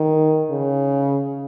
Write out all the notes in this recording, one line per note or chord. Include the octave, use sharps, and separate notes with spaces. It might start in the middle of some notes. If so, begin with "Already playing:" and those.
Already playing: D#3
C#3